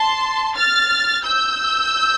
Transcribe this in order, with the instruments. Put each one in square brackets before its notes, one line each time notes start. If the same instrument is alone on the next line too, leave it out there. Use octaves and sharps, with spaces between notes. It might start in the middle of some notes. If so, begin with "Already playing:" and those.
Already playing: [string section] A5 C6
F6 A6
E6 G6